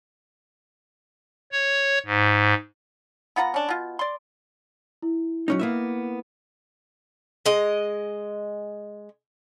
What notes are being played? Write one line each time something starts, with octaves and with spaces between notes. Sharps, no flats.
C#5
G#2
B3 F4 F#5 A#5
C#4 D4
B2 F4
D5 C6
E4
F#3 C#4 D#4
A#3 B3 E5
G#3 D#5